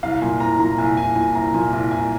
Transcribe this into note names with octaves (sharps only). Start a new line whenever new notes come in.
C2 F5
A#2 G#5
C2 A#5
A#2 A#5
C2 G#5
C2 G#5
A#2 G#5
C2 A#5
A#2 G#5
C2
C2 G#5